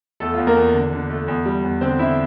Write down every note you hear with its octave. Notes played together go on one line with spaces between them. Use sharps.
E2 A3 A4
F4
E2
A#3 A#4
E2
D3
D3
A3
E2
G3
E2
D3 C4 C5
D3 E4 E5